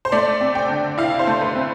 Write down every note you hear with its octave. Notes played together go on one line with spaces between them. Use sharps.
C5
A3 D5
C4
G5
D3
E4 F5
C5
A3
B4
C4